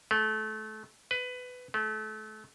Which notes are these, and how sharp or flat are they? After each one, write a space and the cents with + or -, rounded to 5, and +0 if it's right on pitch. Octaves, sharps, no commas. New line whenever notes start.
A3 -25
B4 +20
A3 -30